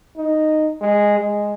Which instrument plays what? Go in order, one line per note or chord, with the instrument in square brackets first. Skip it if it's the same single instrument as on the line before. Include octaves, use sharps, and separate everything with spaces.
[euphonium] D#4
G#3
G#3